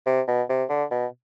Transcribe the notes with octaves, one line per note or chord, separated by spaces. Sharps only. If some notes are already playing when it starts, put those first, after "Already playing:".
C3
B2
C3
D3
B2